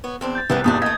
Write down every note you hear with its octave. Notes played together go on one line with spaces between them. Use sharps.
B3 C#5
E2 C4 D4
G6 A6
C2 C3 E3 B3 C#4
F#1 E2 G2 A#2 D#3 D4 D#6
E3 A3 D#5 G#6